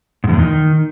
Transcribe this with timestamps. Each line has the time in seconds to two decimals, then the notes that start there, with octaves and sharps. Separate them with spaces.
0.24 G#2
0.29 E2
0.34 A#2
0.39 D#3